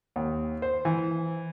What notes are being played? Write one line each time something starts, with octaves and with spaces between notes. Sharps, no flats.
D#2
C5
E3